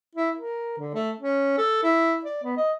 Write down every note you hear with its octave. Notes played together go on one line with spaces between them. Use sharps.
E4
A#4
D3
A3
C#4
A4
E4
D5
B3
D#5